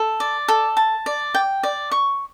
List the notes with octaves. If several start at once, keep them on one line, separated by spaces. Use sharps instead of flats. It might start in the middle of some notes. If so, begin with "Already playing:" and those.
Already playing: A4
D5
A4
A5
D5
G5
D5
C#6